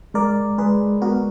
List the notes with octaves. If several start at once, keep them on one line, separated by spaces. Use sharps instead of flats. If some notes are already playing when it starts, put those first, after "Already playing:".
G#3 A#4 D5
G#3 G#4 B4
B3 F#4 A#4